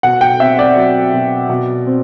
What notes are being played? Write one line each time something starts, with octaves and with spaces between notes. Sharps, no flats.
B2 F#5
G5
C4 E5
D5
F#3
B2
B2
C4